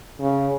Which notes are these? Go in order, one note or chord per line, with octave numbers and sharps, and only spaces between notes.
C#3